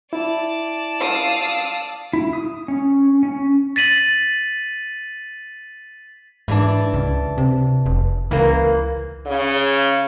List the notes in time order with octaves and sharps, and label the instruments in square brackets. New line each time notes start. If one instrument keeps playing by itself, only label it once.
[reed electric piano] E4 [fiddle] D5 A5
[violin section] F5 E6 [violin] D#6
[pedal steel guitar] E4
D#6
C#4
C#4
[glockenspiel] A6 B6 D#7 F#7
[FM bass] G#2 [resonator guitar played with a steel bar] E3 D4
[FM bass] C#2
C3
F1
[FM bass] C#2 [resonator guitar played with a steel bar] E3 A#3
[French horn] C#3